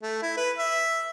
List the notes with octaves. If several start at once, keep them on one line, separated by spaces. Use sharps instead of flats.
A3
E4
B4
E5